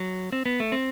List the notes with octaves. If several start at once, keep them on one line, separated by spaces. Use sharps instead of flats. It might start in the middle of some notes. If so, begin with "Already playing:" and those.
Already playing: F#3
C4
B3
A3
C4